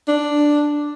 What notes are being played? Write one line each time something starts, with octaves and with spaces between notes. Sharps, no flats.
D4